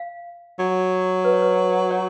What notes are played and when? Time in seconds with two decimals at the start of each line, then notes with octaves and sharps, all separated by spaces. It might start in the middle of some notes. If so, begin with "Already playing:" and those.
Already playing: F5
0.59 F#3
1.25 B4
1.33 C#5
1.42 B4
1.91 C#5